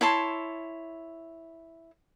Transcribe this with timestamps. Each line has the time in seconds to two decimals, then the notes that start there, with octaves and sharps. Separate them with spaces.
0.01 E4 C#5 A5 C6